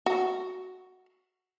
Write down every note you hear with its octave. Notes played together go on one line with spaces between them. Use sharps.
F#4